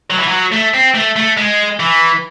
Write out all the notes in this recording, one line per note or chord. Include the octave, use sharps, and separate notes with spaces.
F#3
E3
F#3
A3
C4
A3
A3
G#3
E3